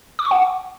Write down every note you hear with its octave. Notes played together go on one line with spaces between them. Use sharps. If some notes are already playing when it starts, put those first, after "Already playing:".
D6
C#6
F#5